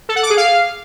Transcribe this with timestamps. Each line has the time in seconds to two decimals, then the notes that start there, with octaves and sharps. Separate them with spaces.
0.09 A4
0.16 F#5
0.23 D6
0.30 G#4
0.37 F5